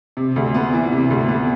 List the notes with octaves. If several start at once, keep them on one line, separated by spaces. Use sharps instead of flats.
C3
D2
B3
E3
C3
D2
B3